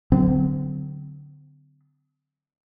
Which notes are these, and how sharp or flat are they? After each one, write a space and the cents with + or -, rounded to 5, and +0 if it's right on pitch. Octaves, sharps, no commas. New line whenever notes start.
D3 -15 F#3 +0 C4 -35